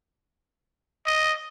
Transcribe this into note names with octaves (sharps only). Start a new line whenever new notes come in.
D#5